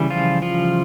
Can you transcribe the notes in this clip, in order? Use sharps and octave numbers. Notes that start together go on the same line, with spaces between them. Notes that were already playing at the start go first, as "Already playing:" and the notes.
Already playing: C#3 E3 G3
F3 F4
F3 F4